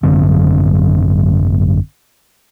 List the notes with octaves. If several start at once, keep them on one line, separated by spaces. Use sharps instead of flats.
G#1 F#2 D3 C4